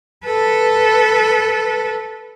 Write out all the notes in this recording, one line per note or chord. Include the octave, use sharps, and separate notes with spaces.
A4 B4